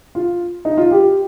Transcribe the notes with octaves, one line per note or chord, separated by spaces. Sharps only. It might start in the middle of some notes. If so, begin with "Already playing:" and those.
F4
D#4
F4
G4